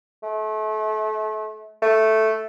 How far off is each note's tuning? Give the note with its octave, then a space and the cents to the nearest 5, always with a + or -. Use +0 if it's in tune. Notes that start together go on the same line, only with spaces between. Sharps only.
A3 -30
A3 +0